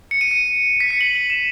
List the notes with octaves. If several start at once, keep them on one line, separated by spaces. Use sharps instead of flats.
C#7
D#7
C#7
B6
C#7
F#7
F#7
E7